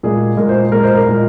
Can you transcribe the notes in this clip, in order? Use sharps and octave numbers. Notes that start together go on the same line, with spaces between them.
A#2 G#3 G#4
A#2 G#3 A#4
C5
A#2 G#3 A#4
C5
A#4
A#2 G#3